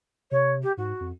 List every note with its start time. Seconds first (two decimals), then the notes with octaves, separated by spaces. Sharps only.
0.31 C3 C#5
0.62 G4
0.77 G#2 F#4
1.00 F2